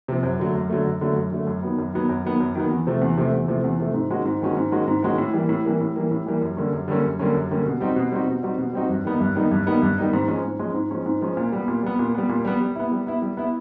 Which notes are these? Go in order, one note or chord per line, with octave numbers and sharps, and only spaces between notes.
C3 F3
F#2
D3 F#3 A3
F#2
D3 F#3 A3
F#2
D3 F#3 A3
F#2
D3 F#3 A3
F#2
D#3 F#3 B3
F#2
D#3 F#3 B3
F#2
D#3 F#3 B3
F#2
D#3 F#3 B3
E2
C3 F3 A3
E2
C3 F3 A3
E2
C3 F3 A3
E2
C3 F3 A3
G#2
D#3 G#3 C#4 F#4
G#2
D#3 G#3 C#4 F#4
G#2
D#3 G#3 C#4 F#4
G#2
D#3 G#3 C#4 F#4
A2
E3 G3 A#3
A2
E3 G3 A#3
A2
E3 G3 A#3
A2
E3 G3 A#3
F#2
D3 G3 A#3 C#4
F#2
D3 G3 A#3 C#4
F#2
D3 G3 A#3 C#4
F#2
D3 G3 A#3 C#4
B2
G3 C4 D#4 F#4
B2
G3 C4 D#4 F#4
B2
G3 C4 D#4 F#4
B2
G3 C4 D#4 F#4
G2
D#3 G3 B3 D#4
G2
D#3 G3 B3 D#4
G2
D#3 G3 B3 D#4
G2
D#3 G3 B3 D#4
G#2
F3 G#3 C#4
G#2
F3 G#3 C#4
G#2
F3 G#3 C#4
G#2
F3 G#3 C#4
A#2
G3 B3
A#2
G3 B3
A#2
G3 B3
A#2
G3 B3
G3
B3 E4
G3
B3 E4
G3
B3 E4